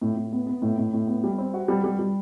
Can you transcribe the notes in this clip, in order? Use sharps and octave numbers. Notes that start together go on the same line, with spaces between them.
A2
A2
B3
B3
A2
A2
A2
B3
G3
C4
F#4
G3
G3
G3